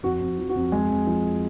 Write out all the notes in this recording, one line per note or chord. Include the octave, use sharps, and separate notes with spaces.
F2 F#4
F2
F3
F#4
F2
F2 G#3 G#4
F2
F3